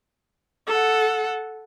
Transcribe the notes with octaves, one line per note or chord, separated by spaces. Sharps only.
A4 F#5